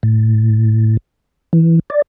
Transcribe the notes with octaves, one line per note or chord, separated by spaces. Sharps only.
A2
E3
D5